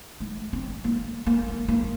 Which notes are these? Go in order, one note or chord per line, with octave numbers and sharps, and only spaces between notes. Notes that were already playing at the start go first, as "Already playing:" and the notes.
A3
C4
A#3
A#3
A#3
A#3